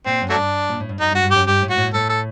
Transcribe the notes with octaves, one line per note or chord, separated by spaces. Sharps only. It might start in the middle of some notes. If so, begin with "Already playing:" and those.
A#2 C4
F#2
F#3 A3 D4
G2
A#2
A2
G2
F#2 D#4
G2
F#4
G2
F#2 G4
G2 G4
A2
F#4
A2
A2 A4
A4